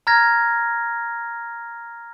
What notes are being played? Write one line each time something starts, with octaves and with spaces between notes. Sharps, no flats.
A#5 F6 G#6 A#6